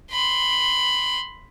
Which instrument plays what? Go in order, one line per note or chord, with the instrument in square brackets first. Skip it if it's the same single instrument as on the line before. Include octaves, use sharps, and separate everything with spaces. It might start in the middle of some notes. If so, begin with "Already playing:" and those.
[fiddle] B5 C6